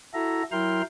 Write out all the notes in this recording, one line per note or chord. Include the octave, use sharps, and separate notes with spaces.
E4 F#4 A4 E5 A#5
F#3 E4 A#4 G5 C6 F6